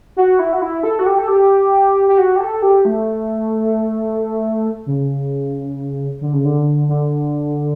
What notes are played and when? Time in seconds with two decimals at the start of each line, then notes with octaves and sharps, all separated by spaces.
0.17 F#4
0.39 E4
0.53 F#4
0.62 E4
0.83 A4
0.99 F#4
1.06 G4
1.18 A4
1.28 G4
2.09 G4
2.18 F#4
2.36 G4
2.40 A4
2.62 G4
2.85 A3
4.86 C#3
6.21 D3
6.33 C#3
6.45 D3
6.88 D3